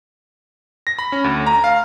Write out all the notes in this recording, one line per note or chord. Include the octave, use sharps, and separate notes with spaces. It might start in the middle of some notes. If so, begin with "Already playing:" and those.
A#6
B5
C#4
D2
A#5
F5